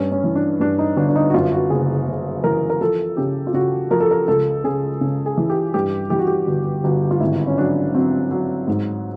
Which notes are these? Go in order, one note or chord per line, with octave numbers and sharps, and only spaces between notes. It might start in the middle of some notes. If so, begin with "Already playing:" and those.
Already playing: G2 C#4
C#4
E3
D4
G2 D4
D#4
G1 D4
D4
D#4
F#4
F#2 F4
F#4
F#1 G#4
F#1
E3 A#4
A#4
F3 A4
C#3 G4
F4
C#3 F#4
F3 A#4
A4
A#4
C#2 A4
C#3 G#4
C#3
G#4
E3
G4
G2 G4
E3 G4
F#4
G4
G1 F#4
G1 F#4
F4
G#1 E4
C#4
F#3 D4
F#3 C4
F#3
G#2